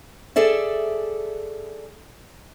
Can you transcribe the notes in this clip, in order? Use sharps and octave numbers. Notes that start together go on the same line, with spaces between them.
G#4 A4 D5 E5